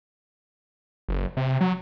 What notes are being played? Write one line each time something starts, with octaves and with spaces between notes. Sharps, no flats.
F#1
C3
F#3